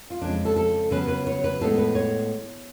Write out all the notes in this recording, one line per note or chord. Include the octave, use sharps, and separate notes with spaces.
F4
F2 C#3 G#3 D4
A4
A4
C#3 F#3 B3 B4
B4
C#5
B4
A2 G#3 B3 A4
B4
C#5